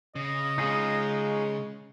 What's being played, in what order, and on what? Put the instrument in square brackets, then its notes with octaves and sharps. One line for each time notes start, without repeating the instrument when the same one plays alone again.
[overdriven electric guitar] C#3 [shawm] D#5
[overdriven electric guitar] C#3 C#4 [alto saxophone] G#3 [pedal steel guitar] D#4 F4 G#4